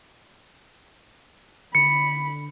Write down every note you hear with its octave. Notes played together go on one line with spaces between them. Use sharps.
D3 B5 C#7